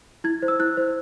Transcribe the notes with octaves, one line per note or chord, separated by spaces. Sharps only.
E4 G#6
C5
E6
E4 F#6
C5